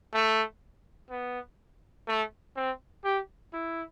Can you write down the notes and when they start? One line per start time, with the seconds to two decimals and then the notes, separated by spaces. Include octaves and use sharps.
0.13 A3
1.10 B3
2.08 A3
2.56 C4
3.04 G4
3.53 E4